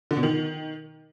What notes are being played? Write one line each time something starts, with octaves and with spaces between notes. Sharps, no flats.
D3
B2
D#3